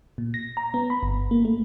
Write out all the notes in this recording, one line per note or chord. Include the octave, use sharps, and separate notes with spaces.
A#2
A#6
A#5
B3
B5
G1
A#3
A3